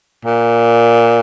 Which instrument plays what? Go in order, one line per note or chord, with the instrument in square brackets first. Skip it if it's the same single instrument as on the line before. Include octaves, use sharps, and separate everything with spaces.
[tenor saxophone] A#2